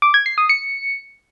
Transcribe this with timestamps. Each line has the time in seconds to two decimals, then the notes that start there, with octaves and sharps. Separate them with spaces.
0.02 D6
0.14 G#6
0.26 C7
0.38 D#6
0.49 C#7